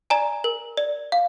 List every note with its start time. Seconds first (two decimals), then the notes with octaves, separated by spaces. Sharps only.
0.10 D5 G#5 A#5
0.44 A#4
0.77 D5
1.12 F5